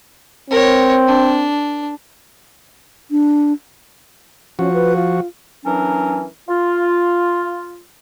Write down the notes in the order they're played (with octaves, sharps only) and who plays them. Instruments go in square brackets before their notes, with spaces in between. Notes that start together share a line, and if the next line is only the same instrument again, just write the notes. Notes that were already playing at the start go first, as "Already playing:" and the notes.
[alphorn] C4 [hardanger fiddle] A#4 C#5
[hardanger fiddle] D4
[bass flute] D4
[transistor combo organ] F3 F#4 [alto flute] C#4
[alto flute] B4
F4
[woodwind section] E3 F#3 C#4 D4 A#4
F4